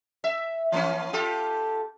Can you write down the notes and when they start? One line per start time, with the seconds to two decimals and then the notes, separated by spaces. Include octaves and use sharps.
0.24 E5
0.72 E3 A#3 C#4
1.13 F4 G4 A4